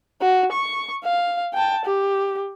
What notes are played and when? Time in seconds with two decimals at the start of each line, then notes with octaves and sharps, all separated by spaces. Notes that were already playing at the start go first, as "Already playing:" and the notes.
0.21 F#4
0.52 C#6
1.04 F5
1.54 G5 A5
1.85 G4